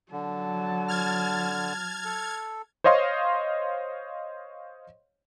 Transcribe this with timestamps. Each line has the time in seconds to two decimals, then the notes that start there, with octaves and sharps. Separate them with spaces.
0.12 D3 F#3 A5
0.88 F6 G#6 A6
2.05 A4
2.84 C5 C#5 D#5 F5 C6